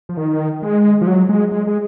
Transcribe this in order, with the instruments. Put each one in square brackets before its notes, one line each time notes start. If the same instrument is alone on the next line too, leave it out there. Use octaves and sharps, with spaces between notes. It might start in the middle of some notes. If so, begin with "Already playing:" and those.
[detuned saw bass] F3
D#3
G#3
F3
F#3
G#3
G#3
G#3